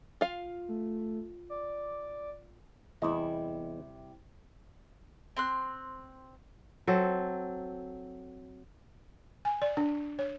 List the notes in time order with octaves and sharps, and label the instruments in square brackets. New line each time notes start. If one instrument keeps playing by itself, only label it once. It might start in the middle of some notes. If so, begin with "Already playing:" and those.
[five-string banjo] F4 F5
[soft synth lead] A3
D5
[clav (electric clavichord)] E2 D#5 [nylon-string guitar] C3 G3 E4
[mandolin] C4 C6 F#6
[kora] F#3 C4 A4
[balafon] G#5
D5
D4
C#5